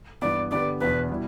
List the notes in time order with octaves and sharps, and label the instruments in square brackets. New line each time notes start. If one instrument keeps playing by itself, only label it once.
[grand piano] G2 E3 B3 [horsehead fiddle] D5
[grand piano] D3 B3 G4 B4 [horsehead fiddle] D5
[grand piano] E2 B2 B3 D4 [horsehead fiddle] B4
[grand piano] B2 G3 E4